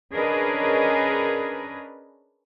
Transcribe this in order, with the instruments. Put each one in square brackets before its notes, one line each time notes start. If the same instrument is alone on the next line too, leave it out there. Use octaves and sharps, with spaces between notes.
[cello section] C#4 D4 G#4 A#4 B4 D#5